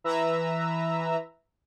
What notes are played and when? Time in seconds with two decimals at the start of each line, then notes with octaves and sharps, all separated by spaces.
0.04 E3 B4 E5 A#5 E6